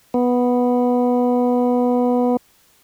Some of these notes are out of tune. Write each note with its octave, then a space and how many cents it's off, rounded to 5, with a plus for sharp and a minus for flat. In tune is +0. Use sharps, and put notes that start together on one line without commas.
B3 -5